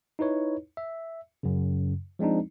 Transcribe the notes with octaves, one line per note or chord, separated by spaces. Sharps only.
D#4 E4 B4 C#5
E5
F#2 C#3
F3 G#3 C4 D4 D#4